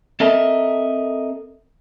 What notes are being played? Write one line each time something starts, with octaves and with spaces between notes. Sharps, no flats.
C4 A4 A#4 D#5 E5 A5